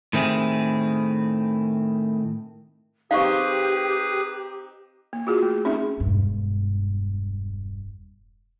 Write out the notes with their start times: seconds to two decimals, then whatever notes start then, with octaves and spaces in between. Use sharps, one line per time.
0.13 A2 D#3 C4 E4 G#4
3.11 C4 D#4 G4 G#4 B4 F5 C#6
5.13 A#3
5.27 F4 F#4 G#4
5.42 A3
5.65 C4 C#4 D#4 G#4 E5
6.00 E1 G2